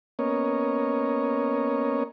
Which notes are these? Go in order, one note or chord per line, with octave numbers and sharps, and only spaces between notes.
A#3 B3 C#4 A#4 C#5 D#5